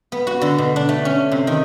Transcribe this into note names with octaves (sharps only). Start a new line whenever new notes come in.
B3
F#4
D3
B2
D4
A3
C#4
C3
D#3